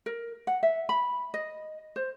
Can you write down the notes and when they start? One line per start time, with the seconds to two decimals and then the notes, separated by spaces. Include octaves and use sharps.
0.06 A#4
0.47 F#5
0.63 E5
0.89 B5
1.34 D#5
1.96 C5